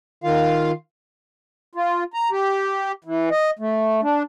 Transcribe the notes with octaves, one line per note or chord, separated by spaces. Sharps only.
D#3 F4 F5
F4
A#5
G4
E3
D#5
A3
D4